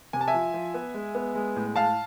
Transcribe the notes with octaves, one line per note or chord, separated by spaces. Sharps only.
C3 G#5
A5
E5 G#5
F3
F3
B3
G#3
B3
G#3
A2
A2 F5 A5